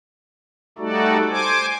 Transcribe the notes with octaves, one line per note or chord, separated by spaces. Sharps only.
G3 A3 D#4 F#4 A4 D5
C5 G#5 D6